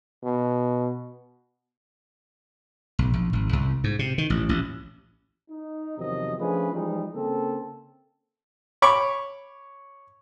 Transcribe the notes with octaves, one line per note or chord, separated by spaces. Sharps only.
B2
B1
A#1
G#1
C2
G#2
C3
D#3
A1
A1
D#4
E2 C3 D#3 F3 F#3 D#5
F3 A3 C#4 D4 G#4 B4
E3 F3 G3 G#3 D#4
C#3 A#3 C4 A4
C#5 B5 C#6 D6